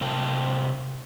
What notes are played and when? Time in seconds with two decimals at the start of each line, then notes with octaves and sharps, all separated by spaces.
0.01 A2 C3 A#4 F5 G5 A5